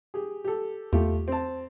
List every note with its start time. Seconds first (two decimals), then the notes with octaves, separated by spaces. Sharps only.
0.14 G4 G#4
0.45 G4 A4
0.93 E2 A3 F4 G4
1.28 C4 A5